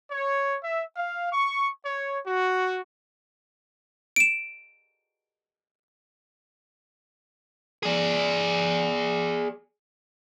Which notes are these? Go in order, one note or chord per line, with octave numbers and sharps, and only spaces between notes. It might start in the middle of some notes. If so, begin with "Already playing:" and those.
C#5
E5
F5
C#6
C#5
F#4
D7 E7
G#4 D5